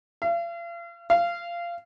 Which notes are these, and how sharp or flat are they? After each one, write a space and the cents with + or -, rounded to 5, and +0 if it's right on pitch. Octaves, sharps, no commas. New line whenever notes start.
F5 -40
F5 -20